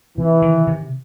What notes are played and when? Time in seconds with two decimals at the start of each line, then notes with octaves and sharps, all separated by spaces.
0.18 C3 E3
0.42 D#3
0.67 C3